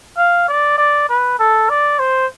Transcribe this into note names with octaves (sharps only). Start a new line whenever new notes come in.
F5
D5
D5
B4
A4
D5
C5